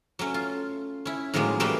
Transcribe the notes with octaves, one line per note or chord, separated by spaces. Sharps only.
F#3 A3 C#4
F4
C#4 E4
A2 D#3 F3 F#3 G#3 A#3
E3 G3 A3 A#3 F#4